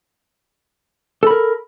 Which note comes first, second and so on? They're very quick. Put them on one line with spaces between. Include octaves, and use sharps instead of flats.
A4 B5 A#4